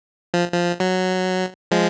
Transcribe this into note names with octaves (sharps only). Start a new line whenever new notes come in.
F3
F3
F#3
F3 G#3